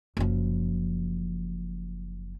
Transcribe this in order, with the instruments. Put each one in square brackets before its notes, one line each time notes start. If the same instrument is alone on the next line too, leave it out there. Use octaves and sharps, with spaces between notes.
[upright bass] F#1 F3